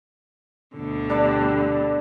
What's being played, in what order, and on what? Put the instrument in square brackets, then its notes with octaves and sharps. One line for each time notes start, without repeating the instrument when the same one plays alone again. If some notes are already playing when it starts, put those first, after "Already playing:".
[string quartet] D2 B2 D3
[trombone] G3 [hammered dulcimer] D4 B4 D5